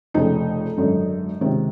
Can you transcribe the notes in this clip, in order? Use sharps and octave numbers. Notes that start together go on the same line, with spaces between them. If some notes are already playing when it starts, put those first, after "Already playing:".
F1 F2 C#3 D#4
G#1 F#2 D3
C#2 C3 D#3